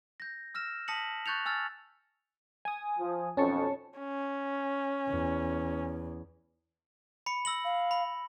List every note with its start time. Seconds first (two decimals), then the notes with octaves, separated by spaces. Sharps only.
0.20 G6 A#6
0.54 E6 F6 A#6 E7
0.88 A5 D#6 A#6 B6 C#7 F#7
1.26 C#6 F#6 G6 A6 C#7 F7
1.46 G#5 E6 F6 A6
2.65 G#5 D#6
2.99 F3
3.37 B1 F2 C#4 A5 C#6
3.99 C#4
5.09 E2
7.26 B5 C#7
7.45 E6 A#6 F#7
7.64 F5
7.91 B5